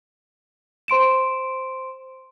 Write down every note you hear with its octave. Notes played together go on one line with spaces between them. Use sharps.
C5 C6 D7 E7